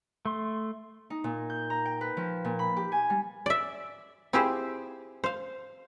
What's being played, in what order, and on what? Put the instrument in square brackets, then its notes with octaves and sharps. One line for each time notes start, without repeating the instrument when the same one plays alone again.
[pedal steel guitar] A3 C6
[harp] D#4
A#2
G6
A#5
G5
B4
F3
A#2
B5
G4
G#5
G3
[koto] D5 E5
C4 E4 F4 G4 G#4 C5
C5 F5